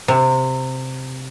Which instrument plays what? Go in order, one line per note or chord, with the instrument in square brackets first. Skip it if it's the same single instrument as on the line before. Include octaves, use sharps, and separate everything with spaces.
[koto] C3